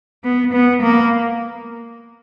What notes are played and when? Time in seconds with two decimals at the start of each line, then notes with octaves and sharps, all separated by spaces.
0.24 B3
0.53 B3
0.82 A#3